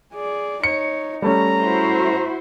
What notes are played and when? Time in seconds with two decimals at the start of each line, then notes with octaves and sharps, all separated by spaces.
0.14 G#4 D5
0.64 D#4 C#5 C#7
1.22 G3 A3 C#4 A#5
1.60 E4 F#4 C5